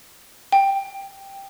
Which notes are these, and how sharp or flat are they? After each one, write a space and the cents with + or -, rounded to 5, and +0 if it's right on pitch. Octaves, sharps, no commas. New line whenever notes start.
G5 +5